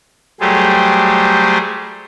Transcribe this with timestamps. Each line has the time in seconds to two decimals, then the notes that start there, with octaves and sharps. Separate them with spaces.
0.41 F#3 G3 A3 G4 G#4 C5